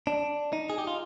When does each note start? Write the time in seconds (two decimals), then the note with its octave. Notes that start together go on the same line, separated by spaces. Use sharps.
0.07 D4
0.53 D#4
0.70 G#4
0.78 G4
0.87 F4